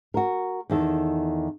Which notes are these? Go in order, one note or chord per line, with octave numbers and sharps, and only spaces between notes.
F#4 A#4
E2 D#3 A4